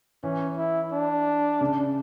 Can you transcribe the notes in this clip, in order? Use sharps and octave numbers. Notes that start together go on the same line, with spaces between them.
E3 C#4
E4
D4
C#3